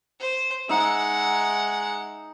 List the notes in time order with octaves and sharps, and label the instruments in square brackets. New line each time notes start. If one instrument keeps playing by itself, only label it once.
[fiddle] C5
[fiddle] G#3 F#5 [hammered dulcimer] D#4 E5